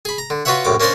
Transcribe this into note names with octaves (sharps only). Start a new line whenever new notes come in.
G#4 B5
A#5
D3
F4 F#4 B4 C#5 E5 F#5
A#1 F#2 A2 D6
A#3 C#4 D4 A#4 C5 D5